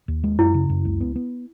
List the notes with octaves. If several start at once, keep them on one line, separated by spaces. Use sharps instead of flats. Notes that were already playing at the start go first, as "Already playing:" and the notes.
D#2
G#3
F#2 E4
C#3
F#2
C#2
B3
B3